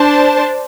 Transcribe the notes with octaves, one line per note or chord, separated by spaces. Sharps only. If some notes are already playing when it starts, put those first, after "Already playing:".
Already playing: D4 C5 A5